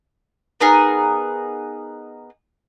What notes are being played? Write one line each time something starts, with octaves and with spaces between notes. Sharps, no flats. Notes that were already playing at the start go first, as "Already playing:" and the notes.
B3 D#4 G#4 A#4